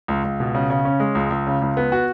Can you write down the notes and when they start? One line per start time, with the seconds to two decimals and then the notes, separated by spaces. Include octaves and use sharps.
0.08 C#2
0.24 C#2
0.40 B2
0.55 C#3
0.70 C#3
0.85 C#4
1.00 G#3
1.15 C#2
1.30 C#2
1.47 C#3
1.62 C#2
1.77 B3
1.92 F#4